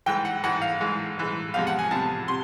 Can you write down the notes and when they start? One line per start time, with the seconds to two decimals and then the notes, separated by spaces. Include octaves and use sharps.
0.06 G#2 E3 G#3 G5
0.25 F#5
0.44 G#2 E3 G#3 F#5
0.62 F5
0.81 G#2 E3 G#3
1.18 G#2 E3 G#3
1.54 E2 C3 F3 G#3 F5
1.67 F#5
1.79 G#5
1.91 E2 C3 F3 G#3 A5
2.28 C3 C6